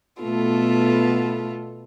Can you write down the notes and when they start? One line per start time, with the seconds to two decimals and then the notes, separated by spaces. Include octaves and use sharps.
0.22 B2 A3 B3 F4 A4